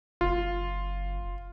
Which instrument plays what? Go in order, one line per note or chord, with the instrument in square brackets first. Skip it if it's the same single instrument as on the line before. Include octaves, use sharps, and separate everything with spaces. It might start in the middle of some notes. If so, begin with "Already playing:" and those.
[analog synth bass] F#1 [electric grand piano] F4